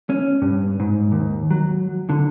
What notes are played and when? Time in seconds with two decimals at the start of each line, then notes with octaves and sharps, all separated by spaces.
0.10 C#4
0.42 G2
0.80 G#2
1.12 D#2
1.51 F#3
2.09 D3